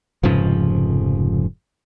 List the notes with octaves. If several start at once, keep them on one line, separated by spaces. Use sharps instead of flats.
F1 G#2 C#3 F3